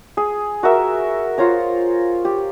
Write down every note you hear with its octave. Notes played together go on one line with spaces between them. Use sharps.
G#4
F#4 A#4 E5
F4 C5 C#5 A#5
G4